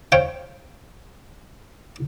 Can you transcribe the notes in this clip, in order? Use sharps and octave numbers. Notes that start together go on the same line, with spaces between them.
C5 C#5 F5 G5